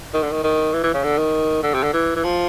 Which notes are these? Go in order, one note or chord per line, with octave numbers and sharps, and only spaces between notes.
D#3
D3
D#3
D#3
E3
E3
C#3
D3
D#3
D3
C3
D3
E3
E3
F3